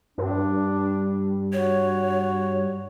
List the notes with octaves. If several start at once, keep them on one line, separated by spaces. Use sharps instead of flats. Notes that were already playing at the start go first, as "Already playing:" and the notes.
G2 D4
F#4 C#5